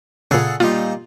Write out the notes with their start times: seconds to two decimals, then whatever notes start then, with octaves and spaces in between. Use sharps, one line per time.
0.31 A#2 C#3 G#4 A4 F#5
0.60 A#2 G3 D#4 F4